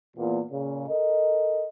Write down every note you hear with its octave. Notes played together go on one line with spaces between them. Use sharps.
E2 A#2
A#2 C#3
A4 A#4 D#5